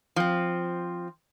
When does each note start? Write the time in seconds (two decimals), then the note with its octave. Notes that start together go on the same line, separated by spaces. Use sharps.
0.16 F3 C4